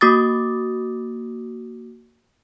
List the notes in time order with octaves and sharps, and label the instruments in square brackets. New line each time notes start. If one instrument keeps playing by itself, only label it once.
[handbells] A#3 F#4 D6 D#6 A6